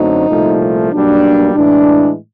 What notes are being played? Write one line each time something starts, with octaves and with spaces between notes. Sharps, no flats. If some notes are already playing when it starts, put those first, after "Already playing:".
Already playing: F#2 D3 F#3 A3 C4 D#4
C2 A#2 F3 A3
B1 B2 G3 A#3 D4
A2 E3 G#3 D4